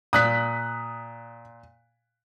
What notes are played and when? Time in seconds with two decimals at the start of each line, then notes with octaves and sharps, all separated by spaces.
0.13 A#2 D#6 F#6 B6